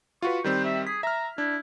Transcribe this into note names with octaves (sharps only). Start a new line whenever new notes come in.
F4 F#4 B4 C#6
D#3 G3 C4 C5
E5
G#4 B6
E5 A#5 F6
D4 E4